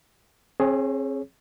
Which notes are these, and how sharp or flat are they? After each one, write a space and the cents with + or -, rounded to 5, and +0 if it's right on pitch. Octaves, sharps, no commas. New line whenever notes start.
C4 +40 G#4 +15 C#5 +0